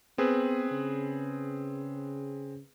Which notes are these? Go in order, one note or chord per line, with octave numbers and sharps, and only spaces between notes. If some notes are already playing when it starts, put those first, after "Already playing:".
B3 C4 G#4 B4
C#3